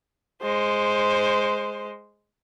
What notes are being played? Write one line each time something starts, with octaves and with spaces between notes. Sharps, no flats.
G#3 C5